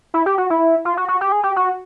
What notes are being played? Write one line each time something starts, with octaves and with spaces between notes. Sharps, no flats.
E4
G4
F#4
E4
F4
F#4
F#4
G4
G#4
G4
F#4